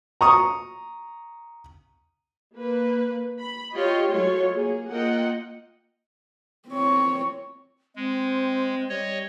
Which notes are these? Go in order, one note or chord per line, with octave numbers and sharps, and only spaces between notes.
A#5 C#6 D#6
A#3 B4
B5
F4 G4 C#5 D#5
F#3 G#3 A3 F4 C#5
A#3 G#4
A#3 F4 A#4 D#5 F#5 G5
C4 C#5
G#3 C4
G3 C#5 D#5